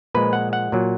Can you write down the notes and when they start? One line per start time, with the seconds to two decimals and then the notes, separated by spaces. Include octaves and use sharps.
0.15 A#2 F3 G#3 B4
0.33 F#5
0.53 F#5
0.72 A#2 F#3